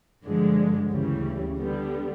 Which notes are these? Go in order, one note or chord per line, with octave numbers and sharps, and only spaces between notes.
G2 D3 F3 G#3
D2 C#3 E3 G3
D3 G3 B3